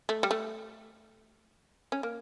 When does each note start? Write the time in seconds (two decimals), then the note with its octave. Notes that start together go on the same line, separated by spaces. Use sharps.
0.09 A3
0.23 G3
0.31 A3
1.92 C#4
2.03 A#3